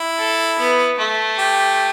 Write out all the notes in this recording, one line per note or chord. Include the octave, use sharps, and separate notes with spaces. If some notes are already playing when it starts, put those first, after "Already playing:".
Already playing: E4
A4
B3
A3
G4